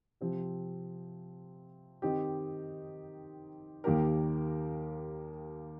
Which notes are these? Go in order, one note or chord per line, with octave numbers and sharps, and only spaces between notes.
C3 F3 C4 G4
D#3 C4 D#4 G4
D#2 D#3 A#3 G4 A#4